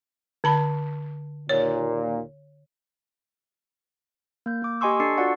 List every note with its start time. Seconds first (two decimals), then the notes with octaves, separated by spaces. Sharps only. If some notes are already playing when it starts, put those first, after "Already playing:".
0.44 D3 A5 B5
1.49 D#2 A#2 C#5
4.46 A#3 G6
4.62 A#3 D6
4.81 G4 D#5 G#5 C6 C#6 E6
5.00 D4 A4 E6 A6 C7 C#7
5.18 F4 F#4 D5 F#5 C#6